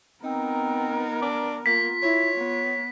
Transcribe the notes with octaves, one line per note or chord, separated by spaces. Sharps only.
B3 C4 D#4 A#4
D4 D6
A#3 F4 B6
E4 C#5
B3